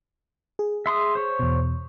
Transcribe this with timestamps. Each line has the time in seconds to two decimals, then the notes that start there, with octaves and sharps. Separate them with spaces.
0.59 G#4
0.86 E5 C6 D#6
1.15 C5 C#5
1.39 E2 B2